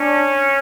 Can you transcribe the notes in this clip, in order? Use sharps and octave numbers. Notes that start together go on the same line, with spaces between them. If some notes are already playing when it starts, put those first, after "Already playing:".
Already playing: C#4 D4